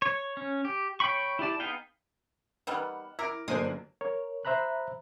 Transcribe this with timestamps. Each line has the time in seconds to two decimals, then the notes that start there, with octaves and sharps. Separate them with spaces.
0.02 C#5
0.37 C#4
0.65 G4
1.00 C#5 G5 B5 C#6
1.39 E4 G4 D5 A5
1.60 B3 D#4 G#4 F5 G5
2.67 D#3 G3 B3 F#5 E6 F6
3.19 E4 A#4 D6 A#6 D7
3.48 G1 F#2 D3 G#3 A#3 D4 C5 D#6
4.01 A#4 C#5
4.45 C5 E5 A#5 B5 F#6